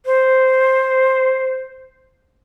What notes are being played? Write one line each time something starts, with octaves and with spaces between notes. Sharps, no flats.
C5